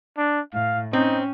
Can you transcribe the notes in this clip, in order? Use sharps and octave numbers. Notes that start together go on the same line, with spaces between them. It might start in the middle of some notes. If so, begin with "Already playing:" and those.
D4
A2 F5
C4 C#4 D#4